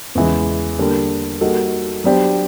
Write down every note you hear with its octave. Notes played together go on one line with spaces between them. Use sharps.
E2 C#3 E3 G#3
D3 G3 A#3
G3 A#3 D#4 F#4 A4
F#3 B3 D4 G4 C5